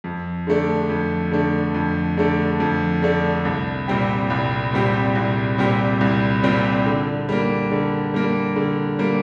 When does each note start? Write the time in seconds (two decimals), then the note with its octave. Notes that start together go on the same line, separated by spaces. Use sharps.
0.04 F2
0.47 D3 A3 D4
0.89 F2
1.32 D3 A3 D4
1.74 F2
2.17 D3 A3 D4
2.60 F2
3.02 D3 A3 D4
3.45 C2
3.88 A#2 G3 C4 G4
4.30 C2
4.73 A#2 G3 C4 G4
5.15 C2
5.58 A#2 G3 C4 G4
6.01 C2
6.43 A#2 G3 C4 G4
6.86 D3
7.29 G3 A#3
7.72 D3
8.14 G3 A#3
8.56 D3
8.99 G3 A#3